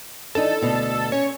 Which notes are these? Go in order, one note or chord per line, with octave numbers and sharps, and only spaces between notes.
E3 D4 D#4 A4
D2 B2
C#4 C#5